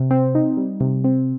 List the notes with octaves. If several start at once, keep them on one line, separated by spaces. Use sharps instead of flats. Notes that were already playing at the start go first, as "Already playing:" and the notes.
Already playing: C3
C4
D#4
G3
C3
C4